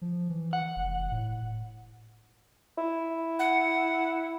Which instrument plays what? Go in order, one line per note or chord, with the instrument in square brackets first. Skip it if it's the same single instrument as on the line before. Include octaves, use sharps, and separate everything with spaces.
[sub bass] F3
E3
[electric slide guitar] F#5
[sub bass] F1
A2
[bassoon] E4
[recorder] F#5